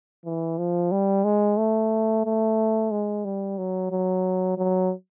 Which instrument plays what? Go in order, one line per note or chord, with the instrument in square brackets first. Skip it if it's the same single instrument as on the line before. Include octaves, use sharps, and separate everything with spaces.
[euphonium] E3
F3
G3
G#3
A3
A3
G#3
G3
F#3
F#3
F#3